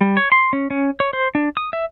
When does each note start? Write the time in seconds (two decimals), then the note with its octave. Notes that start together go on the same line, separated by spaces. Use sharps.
0.01 G3
0.17 C#5
0.32 C6
0.53 C#4
0.70 C#4
1.00 C#5
1.13 C5
1.35 D4
1.57 D#6
1.73 E5